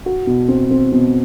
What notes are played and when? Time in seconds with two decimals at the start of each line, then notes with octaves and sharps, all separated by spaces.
0.06 F#4
0.27 B2
0.48 C4
0.71 C4
0.92 B2